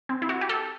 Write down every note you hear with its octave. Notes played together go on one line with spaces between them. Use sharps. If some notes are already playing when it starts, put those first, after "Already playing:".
C4
E4
F#4
G4
A4